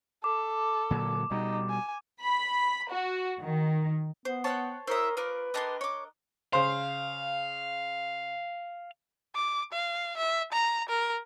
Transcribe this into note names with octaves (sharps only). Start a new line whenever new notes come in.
A4 D6
A#2 D3 F#3
B2 G3 D#4
G#5
B5
F#4
D#3
B3 C5
C5 C#5 F#5 G5 A5 F#6
E4 A#4 C5 C#5 E5 D#6
F4 A#4 B4 D6
D4 G4 A4 A#4 D#5 C6
C#5 D6
C#3 C5 F5
D6
F5
E5
A#5
A#4